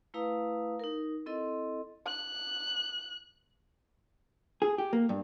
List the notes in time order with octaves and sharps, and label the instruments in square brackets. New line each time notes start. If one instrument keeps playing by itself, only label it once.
[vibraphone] A3 E4 B4 F5 A#5 D#6
D#4 A#4
C4 E4 A4 D#5 C6
[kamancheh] F#6
[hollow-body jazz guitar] G#4
G4
A#3
G2